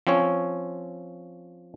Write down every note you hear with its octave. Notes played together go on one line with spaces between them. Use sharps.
F3 C4 C#4 C#5